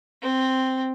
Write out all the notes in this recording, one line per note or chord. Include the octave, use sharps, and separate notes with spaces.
C4